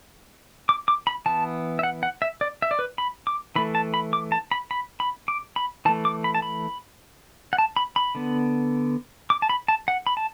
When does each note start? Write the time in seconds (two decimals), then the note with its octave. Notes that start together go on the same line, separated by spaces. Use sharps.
0.69 D6
0.88 D6
1.07 B5
1.26 E3 B3 A5
1.79 E5
1.83 F#5
2.03 F#5
2.22 E5
2.41 D5
2.62 E5
2.71 D5
2.79 B4
2.98 B5
3.27 D6
3.56 E3 A3 B5
3.75 A5
3.94 B5
4.13 D6
4.32 A5
4.51 B5
4.71 B5
5.00 B5
5.28 D6
5.56 B5
5.85 E3 A5
5.89 A3
6.05 D6
6.24 B5
6.35 A5
6.42 B5
7.53 F#5
7.58 A5
7.76 B5
7.96 B5
8.15 D3 B3
9.30 D6
9.42 A5
9.49 B5
9.68 A5
9.88 F#5
10.07 B5
10.17 A5